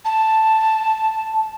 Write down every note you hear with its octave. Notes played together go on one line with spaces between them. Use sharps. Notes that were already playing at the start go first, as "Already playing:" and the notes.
A5